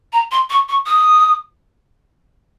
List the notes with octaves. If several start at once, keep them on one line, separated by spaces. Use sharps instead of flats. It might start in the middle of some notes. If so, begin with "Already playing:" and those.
A#5
C6
C#6
C#6
D#6